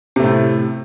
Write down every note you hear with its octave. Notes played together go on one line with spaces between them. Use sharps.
A2 C3 A3